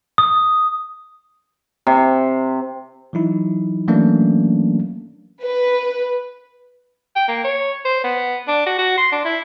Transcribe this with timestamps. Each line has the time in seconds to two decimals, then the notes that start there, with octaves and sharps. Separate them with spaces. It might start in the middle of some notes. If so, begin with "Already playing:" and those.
0.18 D#6
1.87 C3
3.13 E3 F#3 D#4 E4
3.88 E3 F#3 A3 A#3 C#4 D4
5.44 B4
7.16 G5
7.28 A#3
7.44 C#5
7.85 C5
8.04 B3
8.48 D4
8.66 F#4
8.79 F#4
8.98 C6
9.12 D4
9.25 E4